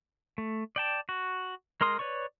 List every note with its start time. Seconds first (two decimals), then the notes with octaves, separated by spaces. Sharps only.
0.38 A3
0.76 D5 G5 A5
1.09 F#4
1.81 G#3 A#4 C6 D#6
1.99 B4 C#5 D5 C#6